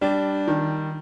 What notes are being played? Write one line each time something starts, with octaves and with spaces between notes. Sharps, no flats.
G3 D4
D#3